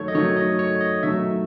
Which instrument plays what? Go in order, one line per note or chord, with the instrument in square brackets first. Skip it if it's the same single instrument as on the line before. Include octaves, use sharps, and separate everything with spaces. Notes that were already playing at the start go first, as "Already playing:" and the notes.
Already playing: [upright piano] D#3 F#3 A3 [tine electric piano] A4 C#5
[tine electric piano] D#5
[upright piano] D#3 F#3 A3 [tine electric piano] C#5
[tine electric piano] D#5
C#5
D#5
[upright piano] D#3 F#3 A3 [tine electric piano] E5